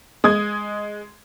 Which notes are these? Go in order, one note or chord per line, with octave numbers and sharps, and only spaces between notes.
G#3 D#6 G#6